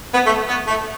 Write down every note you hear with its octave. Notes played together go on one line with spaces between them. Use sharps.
B3
A3
B3
A3